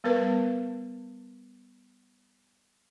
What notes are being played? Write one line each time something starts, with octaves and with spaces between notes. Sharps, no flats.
G3 B3 A#4 B4